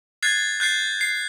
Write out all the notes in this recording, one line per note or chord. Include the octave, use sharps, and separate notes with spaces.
F#6 G#6 A6 C7
F#6 G6 A6 C7
C7